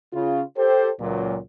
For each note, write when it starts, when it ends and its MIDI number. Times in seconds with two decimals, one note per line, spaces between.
0.13 0.41 49
0.13 0.41 65
0.57 0.89 67
0.57 0.89 69
0.57 0.89 72
1.00 1.38 37
1.00 1.38 46
1.00 1.38 54